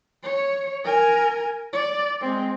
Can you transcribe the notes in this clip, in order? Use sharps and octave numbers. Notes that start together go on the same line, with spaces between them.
C#5
A#4 G#5
D5
G#3 C4